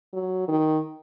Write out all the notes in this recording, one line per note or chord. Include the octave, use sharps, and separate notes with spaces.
F#3
D#3